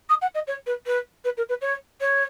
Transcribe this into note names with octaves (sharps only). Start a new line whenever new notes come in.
D#6
F#5
D#5
C#5
B4
B4
B4
A#4
B4
C#5
C#5